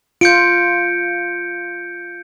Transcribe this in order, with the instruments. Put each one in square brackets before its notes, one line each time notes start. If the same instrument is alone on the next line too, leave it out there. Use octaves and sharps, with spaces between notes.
[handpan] F4 [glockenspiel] G6 C#7 D7